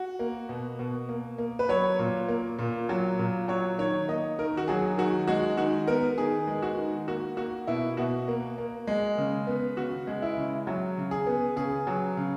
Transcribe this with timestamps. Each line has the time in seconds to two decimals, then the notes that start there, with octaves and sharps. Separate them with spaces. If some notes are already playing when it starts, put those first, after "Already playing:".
Already playing: F#4
0.19 A#3
0.49 B2
0.79 B2
1.09 A#3
1.38 A#3
1.59 B4
1.69 F#3 C#5
1.99 A#2
2.28 A#3
2.59 A#2
2.89 F#3
3.19 A#2
3.48 F#3 C#5
3.79 D#3 C#5
4.08 A#3 D#5
4.39 D#3 A#4
4.57 F#4
4.68 F#3 G#4
4.98 D#3 F#4
5.27 G#3 F#4
5.57 D#3 F#4
5.88 B3 A#4
6.18 D#3 G#4
6.47 G#3
6.62 F#4
6.78 D#3
7.08 A#3 F#4
7.37 A#3 F#4
7.67 B2 E4
7.97 B2 F#4
8.28 A#3
8.58 A#3
8.87 G#3
9.18 C#3
9.47 B3
9.77 C#3 F#4
10.07 G#3
10.22 E4
10.37 C#3
10.67 F#3
10.97 C#3
11.11 G#4
11.27 B3
11.56 C#3 G#4
11.87 F#3
12.17 C#3